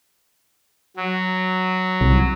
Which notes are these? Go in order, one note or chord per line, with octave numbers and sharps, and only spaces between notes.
F#3
C2